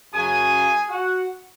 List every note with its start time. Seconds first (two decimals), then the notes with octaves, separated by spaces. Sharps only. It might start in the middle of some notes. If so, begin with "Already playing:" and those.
0.13 F#2 C#3 F#3 G#4 G#5
0.89 F#4 F#5